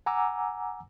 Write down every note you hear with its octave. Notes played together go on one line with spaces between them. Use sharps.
F#5 G#5 A#5 D6 E6